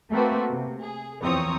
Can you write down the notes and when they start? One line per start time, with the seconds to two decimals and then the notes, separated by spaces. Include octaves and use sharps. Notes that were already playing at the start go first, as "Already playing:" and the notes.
0.11 A3 A#3 C4 F#4 B4
0.50 C3
0.82 G#4
1.21 E2 F3 C4 C#5 A#5 D#6